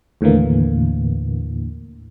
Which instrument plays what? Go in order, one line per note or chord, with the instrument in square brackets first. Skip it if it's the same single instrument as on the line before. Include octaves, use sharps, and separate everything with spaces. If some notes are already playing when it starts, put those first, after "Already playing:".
[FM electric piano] D#2 A2 D3 E3 A#3